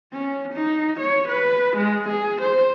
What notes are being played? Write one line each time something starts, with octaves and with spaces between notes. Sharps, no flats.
C#4
D#4
C#5
B4
G#3
G#4
C5